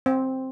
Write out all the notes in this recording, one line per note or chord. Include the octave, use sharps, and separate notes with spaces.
C4